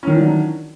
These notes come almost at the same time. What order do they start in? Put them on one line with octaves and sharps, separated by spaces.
C#4 D#3 E3 D4 F#3